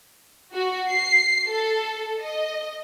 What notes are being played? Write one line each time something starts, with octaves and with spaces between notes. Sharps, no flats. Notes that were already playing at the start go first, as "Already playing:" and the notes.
F#4
C7
A4
D#5